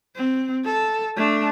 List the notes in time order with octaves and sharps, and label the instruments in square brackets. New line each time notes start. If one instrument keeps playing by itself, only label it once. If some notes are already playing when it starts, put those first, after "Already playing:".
[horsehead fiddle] C4
A4
A3 D4